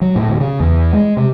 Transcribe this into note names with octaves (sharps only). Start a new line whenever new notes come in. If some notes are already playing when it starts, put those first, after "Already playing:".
F#3
A2
D2
C#3
E2
G#3
C3